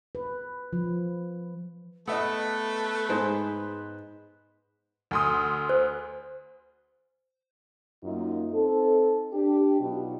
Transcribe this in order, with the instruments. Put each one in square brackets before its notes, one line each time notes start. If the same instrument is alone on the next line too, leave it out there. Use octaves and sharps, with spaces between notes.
[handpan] B4
F3
[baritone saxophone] A3 [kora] B3 [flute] B4 [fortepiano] D#5 E5 E6
[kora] G#2 G#3 [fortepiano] B3 C5
[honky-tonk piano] D2 C6 D#6
[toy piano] C5
[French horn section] F#2 A#3 D#4 F4
C4 D#4 A4
D4 G4
B2 F#3 D#4 F4 F#4